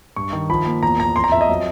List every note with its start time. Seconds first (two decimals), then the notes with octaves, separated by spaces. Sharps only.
0.16 G2 C#6
0.33 D#3
0.49 F3 B5
0.66 A#3
0.83 E2 A#5
1.00 E2 A#5
1.16 F2 C6
1.24 A#5
1.32 F2 E5
1.41 D#5
1.49 F#3